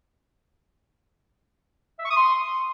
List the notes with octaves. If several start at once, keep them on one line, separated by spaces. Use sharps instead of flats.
E5
C#6
D#6
C6